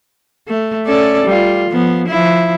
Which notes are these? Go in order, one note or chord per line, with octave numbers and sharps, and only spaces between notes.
A3
C#4 A4 D5
G3 F4
F3 B3
F3 E4